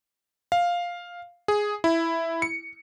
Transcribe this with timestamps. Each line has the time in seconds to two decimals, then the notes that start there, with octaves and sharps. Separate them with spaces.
0.52 F5
1.48 G#4
1.84 E4
2.42 C#7